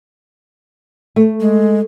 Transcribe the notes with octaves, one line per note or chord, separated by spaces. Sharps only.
A3
G#3